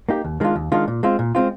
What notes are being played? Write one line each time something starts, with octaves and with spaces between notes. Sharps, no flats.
A#3 D#4 G4
D#2
D#3 G#3 D4 F4
D#2
D#3 G#3 D4 F4
A#2
G#3 C4 F4
A#2
G#3 C4 F4